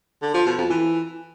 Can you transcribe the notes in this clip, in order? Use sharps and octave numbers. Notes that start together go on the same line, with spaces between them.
D3
F3
B2
F2
E3